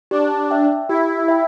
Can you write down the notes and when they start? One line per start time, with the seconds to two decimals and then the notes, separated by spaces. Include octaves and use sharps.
0.11 D4 G4
0.51 E5 G5
0.89 E4 G4
1.28 E5 G5